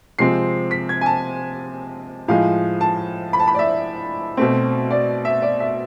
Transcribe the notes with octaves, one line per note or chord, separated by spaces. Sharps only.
C3 F3 G#3 C4 C7
B6
G#6
G#5
A5
A2 F3 G#3 F5
A5
B5
A5
B5
D5
E5
B2 A3 C4
D5
E5
D5
E5